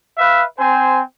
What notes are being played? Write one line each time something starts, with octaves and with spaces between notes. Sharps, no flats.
B4 E5 F5
C4 C5 G#5